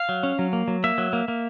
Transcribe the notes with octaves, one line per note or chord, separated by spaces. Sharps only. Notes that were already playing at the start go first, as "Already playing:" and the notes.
Already playing: F5
F#3
C#4
F#3
A#3
F#3
A#3 E5
F#3
A#3
A#3